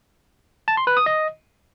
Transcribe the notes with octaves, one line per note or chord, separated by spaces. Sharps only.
A5
C6
B4
D#6
D#5